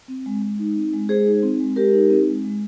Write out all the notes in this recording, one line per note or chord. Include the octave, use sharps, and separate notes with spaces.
C4
G#3
G#3
D#4
C4
G#3
G#3 G#4 C5
D#4
C4
G#3
G#3 G4 A#4
D#4
C4
G#3
G#3